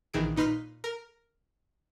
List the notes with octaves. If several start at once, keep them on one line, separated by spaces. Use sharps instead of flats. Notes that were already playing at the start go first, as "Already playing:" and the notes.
A#1 D#3 E3 G#4 D7
A#2 D#4 B4 C6 F6 B6
A#4